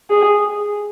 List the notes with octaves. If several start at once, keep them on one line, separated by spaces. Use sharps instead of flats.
G#4